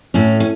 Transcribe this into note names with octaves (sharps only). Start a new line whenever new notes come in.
A2 C#4
C#4